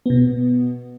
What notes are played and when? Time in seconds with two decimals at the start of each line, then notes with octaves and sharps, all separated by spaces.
0.06 B2 B3